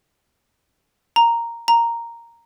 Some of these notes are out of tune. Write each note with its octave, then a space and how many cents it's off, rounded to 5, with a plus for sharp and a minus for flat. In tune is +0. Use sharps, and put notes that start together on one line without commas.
A#5 -5
A#5 -5